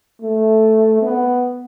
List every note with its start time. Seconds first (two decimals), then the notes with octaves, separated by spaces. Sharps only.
0.22 A3
1.02 B3